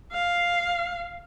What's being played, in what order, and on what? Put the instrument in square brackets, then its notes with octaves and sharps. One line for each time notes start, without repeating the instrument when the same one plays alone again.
[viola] F5